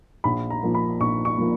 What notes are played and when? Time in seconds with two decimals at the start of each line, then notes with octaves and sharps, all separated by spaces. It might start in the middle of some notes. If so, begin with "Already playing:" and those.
0.24 A#1 B5
0.50 A#5
0.63 A#2 F3 A#3
0.75 B5
1.00 A#1 C#6
1.25 C#6
1.38 A#2 F3 A#3